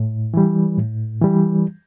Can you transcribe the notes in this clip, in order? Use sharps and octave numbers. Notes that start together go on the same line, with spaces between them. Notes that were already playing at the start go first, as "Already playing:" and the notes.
Already playing: A2
E3 G3
A2
E3 G3